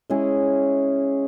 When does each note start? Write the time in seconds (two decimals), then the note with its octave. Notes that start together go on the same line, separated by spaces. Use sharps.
0.10 G#3 C#4 E4 G#4